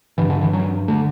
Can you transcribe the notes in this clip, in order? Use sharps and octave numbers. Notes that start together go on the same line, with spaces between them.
G2 D3 E3
D3
E3
F#3
D3 A3